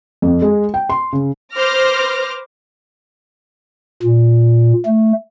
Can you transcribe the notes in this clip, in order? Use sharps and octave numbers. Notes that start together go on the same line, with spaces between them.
F2
G#3
G5
C6
C#3
B4 C5 D6 F6 A#6
A#2
A3